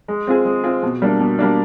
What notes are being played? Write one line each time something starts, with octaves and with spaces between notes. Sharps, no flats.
G#3
C4 F4 G#4
G#3
C4 F4 G#4
B2
G3 A#3 D4
B2
G3 A#3 D4